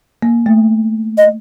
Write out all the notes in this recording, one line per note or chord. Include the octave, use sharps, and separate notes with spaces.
A#3
A3
D#5